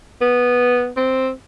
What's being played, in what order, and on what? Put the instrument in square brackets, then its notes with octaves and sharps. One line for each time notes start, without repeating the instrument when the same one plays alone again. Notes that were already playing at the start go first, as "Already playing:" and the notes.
[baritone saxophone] B3
C4